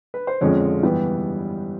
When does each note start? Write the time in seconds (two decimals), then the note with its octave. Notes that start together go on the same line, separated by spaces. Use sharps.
0.14 B4
0.27 C5
0.41 F2 D3 F3 G#3 C#4 C#5
0.83 G2 E3 G3 B3